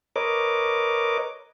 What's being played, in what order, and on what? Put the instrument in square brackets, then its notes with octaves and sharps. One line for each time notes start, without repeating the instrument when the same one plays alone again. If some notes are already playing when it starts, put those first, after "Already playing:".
[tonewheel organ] A#4 B4 C#5 D#5 D6